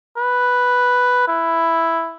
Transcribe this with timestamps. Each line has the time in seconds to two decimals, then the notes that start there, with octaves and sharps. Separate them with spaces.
0.17 B4
1.28 E4